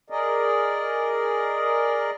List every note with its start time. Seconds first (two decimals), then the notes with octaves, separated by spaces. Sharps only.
0.10 G#4 A#4 D5 D#5